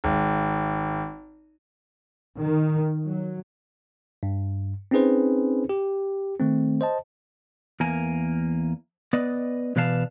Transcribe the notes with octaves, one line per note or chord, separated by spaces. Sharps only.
G#1
D#3
F#3
G2
C4 C#4 D#4 G#4 B4 C5
G4
D#3 A3 C4
C5 D#5 A5
E2 A#3 A#4 G#5
B3 B4 D5 D#5
B2 E3 B4 D5 F5 A5